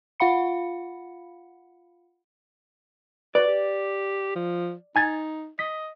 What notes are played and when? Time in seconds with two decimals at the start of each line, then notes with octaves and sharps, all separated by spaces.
0.20 F4 F5 F#5 B5 C#7
3.35 F#4 B4 D5
3.48 G4
4.36 F3
4.96 D#4 G#5 G#6 A6
5.59 D#5 B6